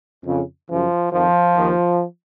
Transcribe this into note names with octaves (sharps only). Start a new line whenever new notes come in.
F2 C#3
F#2 C#3 F3
F2 D#3 F3
D#2 D#3